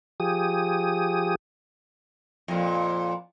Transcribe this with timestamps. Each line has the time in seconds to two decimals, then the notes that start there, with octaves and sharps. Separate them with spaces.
0.20 F3 G4 G#4 D#6
2.48 F2 A#2